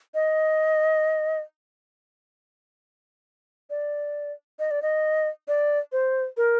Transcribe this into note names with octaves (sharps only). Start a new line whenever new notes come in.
D#5
D5
D#5
D5
D#5
D5
C5
A#4